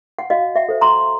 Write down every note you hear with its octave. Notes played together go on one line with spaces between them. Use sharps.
F#5
F#4 D#5 F5
E5 F#5
A4 C5
A#5 C6